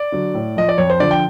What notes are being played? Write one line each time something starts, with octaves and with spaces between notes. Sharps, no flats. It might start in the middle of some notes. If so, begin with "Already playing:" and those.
Already playing: D5
D3 F#3
A2
F3 D#5
D5
F2 C#5
C5
D3 F3 D5
G5